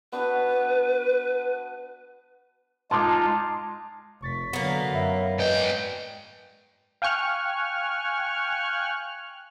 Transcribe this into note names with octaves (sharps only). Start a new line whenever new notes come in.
B3 D4 F#4 B4
G#3 D#4 F4 A5 C6 D6
F1 C#6 A6 B6
D3 F#3 A#3 B3
F#2 E5 F5 B5
G#2 B4 D5 D#5 G5
F5 G5 G#5 C#6 F6 F#6